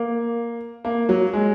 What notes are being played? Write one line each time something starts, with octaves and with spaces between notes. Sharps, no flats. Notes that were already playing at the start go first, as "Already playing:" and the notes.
Already playing: A#3
A#3
F#3
G#3